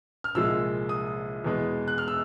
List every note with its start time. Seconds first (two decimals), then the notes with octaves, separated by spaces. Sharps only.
0.24 F6
0.35 C2 A#2 F3 G#3 E6
0.89 D#6
1.44 E2 B2 G#3
1.88 F#6
1.98 F6
2.08 E6